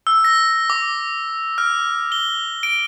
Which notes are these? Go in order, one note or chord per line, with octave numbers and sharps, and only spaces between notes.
E6
A#6
D6
F6
G7
D7